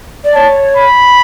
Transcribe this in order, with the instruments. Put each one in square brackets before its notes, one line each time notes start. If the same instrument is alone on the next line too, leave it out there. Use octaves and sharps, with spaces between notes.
[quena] D5
[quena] C#5 [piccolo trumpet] A5
[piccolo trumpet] B5